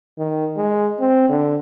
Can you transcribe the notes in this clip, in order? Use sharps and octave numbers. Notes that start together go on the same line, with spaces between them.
D#3
G#3
C4
D3